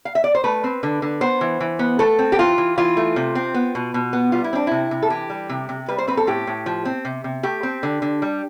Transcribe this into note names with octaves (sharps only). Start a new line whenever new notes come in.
F5
E5
D5
C5
A3 B4
C4
D3
D3
B3 C5
E3
E3
B3
A3 A4
C4
G4
E3 F4
E3
E3 F4
A3
C3
C4
B3
B2
B2
B3
G3 F4
E4
C4 D4
C3 E4
C3
A4
E3 G4
G3
C3
C3
G3 B4
C5
C4 B4
A4
A2 G4
A2
F3
C4
C3
C3
A3 G4
C4
D3
D3
G3